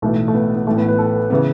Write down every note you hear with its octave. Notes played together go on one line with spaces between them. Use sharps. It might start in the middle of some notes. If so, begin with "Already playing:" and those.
B1 A2 E3 A3
A3
B3
B3
A1 A2 E3 A3
B3
B4
A4
C#3 E3 B3